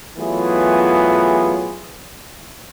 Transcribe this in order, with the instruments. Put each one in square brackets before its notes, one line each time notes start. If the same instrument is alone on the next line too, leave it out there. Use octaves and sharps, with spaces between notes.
[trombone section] E3 F#3 A3 B3 F4 G#4